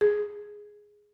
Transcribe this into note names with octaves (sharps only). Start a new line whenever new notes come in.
G#4